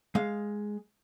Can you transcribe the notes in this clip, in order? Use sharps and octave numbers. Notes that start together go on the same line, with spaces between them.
G#3 F5